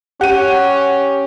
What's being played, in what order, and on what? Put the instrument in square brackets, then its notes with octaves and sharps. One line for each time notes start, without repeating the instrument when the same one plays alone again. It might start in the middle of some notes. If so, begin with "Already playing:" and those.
[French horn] C#4 [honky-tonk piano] G4 D#7 [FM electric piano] F#5